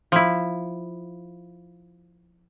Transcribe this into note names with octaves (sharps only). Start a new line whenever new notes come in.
F3 E4